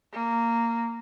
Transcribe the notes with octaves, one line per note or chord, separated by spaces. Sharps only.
A#3